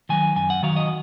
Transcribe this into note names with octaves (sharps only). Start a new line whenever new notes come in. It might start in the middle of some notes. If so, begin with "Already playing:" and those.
D#3 F#3 G#5
F#2 G#5
F#5
D#3 F#3 F5
D#5